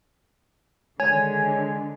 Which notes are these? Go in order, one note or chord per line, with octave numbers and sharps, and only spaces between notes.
D3 D#3 G#3 C#5 G#5